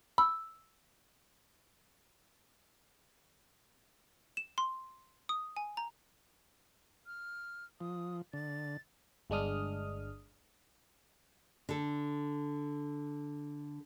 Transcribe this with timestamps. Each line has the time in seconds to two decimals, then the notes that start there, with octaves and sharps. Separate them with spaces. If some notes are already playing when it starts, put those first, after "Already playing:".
0.18 B5 E6
4.37 E7
4.58 C6
5.29 D#6
5.57 G#5
5.77 A#5
7.06 F6
7.81 F3 D#6
8.33 D3 A6
9.30 G1 G#3 D4 D#6 F6
11.69 D3 A4